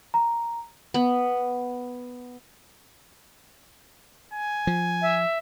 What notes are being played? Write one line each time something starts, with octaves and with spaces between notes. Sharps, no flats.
A#5
B3
G#5
F3
E5